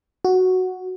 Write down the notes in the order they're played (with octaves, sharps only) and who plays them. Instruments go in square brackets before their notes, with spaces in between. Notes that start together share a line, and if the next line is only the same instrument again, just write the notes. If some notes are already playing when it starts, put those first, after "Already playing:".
[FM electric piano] F#4